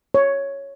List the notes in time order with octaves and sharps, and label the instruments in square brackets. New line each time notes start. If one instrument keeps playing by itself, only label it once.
[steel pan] C#5